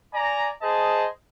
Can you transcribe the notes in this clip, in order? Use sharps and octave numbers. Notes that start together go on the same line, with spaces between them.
D5 G#5 A#5
G#4 C5 D#5 A5